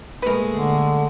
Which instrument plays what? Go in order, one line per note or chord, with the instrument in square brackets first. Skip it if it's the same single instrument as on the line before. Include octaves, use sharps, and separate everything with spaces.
[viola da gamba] A#2 G#3 A3 [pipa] A#4 B4
[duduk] D3